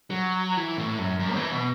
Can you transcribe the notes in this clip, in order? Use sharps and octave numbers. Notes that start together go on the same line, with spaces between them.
F#3
E3
A2
F#2
F#2
E3
B2